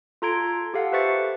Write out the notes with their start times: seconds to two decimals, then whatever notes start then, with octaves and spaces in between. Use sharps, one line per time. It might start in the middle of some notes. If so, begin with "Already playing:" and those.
0.22 F4 A4 A#5 C6 G#6 D7
0.74 G4 A4 F5 F#5
0.93 B4 C5 E5 C#6 A6 C#7